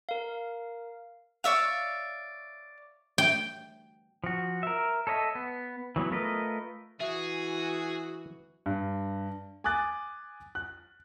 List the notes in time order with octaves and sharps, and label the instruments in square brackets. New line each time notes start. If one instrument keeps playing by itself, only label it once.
[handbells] A#4 F5
[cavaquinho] C#5 D5 E5 F5
[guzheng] G5
[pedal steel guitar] F3 F#4
A#4 E5
A4 C#5 D#5 E5
B3
E3 F#3 B3
A3 F4 A#4 B4 D#5
[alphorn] E3 [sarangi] F#4 [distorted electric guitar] G#4 [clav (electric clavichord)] E5
[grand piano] G2
G#5 D6 D#6 F#6 A6
F#6